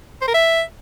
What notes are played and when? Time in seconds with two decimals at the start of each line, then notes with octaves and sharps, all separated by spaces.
0.22 C5
0.28 A#4
0.34 E5